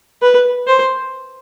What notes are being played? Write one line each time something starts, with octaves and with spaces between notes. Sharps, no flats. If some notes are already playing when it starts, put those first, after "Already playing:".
B4
C5